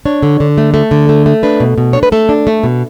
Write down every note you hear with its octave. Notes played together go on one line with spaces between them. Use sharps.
D4 C#5
D3
D3
A3
A3
D3
A3
A3
D4 B4
B2
B2
D4 C#5
B4
A3 A4
D4
A3
B2